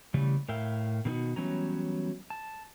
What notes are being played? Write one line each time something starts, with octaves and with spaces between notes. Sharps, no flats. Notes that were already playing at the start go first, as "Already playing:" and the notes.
C#3 E3 G3 A3
A2 A#4 E5 F5 G5
B2 D#3 F#3 A#3 D#4 F#4
E3 F#3 G3 B3 C#4 A#5
A5